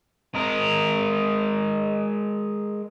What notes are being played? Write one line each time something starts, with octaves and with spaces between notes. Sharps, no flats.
G#3 A#4